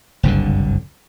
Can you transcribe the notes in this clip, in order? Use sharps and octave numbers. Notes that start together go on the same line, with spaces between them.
F#1 C2 G2 D3